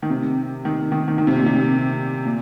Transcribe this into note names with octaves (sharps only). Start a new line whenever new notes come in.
D#3
C3
D#3
D#3
D#3
D#3
C3
A#2
C3
A#2